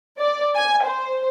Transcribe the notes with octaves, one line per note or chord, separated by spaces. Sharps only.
D5
G#5
C5